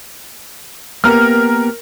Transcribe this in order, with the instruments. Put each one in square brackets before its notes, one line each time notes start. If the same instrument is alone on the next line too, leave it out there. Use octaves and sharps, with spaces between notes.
[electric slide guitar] A#3 B3 G4 [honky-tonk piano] A#4 F6